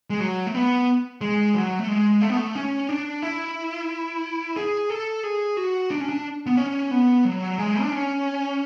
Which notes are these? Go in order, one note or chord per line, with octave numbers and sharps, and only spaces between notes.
G#3
F#3
A3
B3
G#3
F#3
A3
G#3
A3
B3
A3
C#4
D4
E4
G#4
A4
G#4
F#4
D4
C#4
D4
B3
C#4
B3
F#3
G#3
D4
C#4